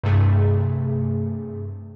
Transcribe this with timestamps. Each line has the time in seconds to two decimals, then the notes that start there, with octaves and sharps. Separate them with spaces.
0.04 G2 C3 A3 G#4